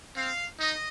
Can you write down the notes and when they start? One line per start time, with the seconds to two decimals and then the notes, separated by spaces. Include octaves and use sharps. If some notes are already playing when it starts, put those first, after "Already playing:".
0.15 C4 F5
0.60 D#4 D#5